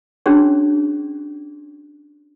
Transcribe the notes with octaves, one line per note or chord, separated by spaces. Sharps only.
C#4 D4 F#4 G#4 C#5